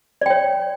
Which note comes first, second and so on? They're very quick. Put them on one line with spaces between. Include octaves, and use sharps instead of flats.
D5 G5 C#5